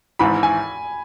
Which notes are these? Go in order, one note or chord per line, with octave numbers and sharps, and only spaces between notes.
G#1 G#2 E3 B5
G#5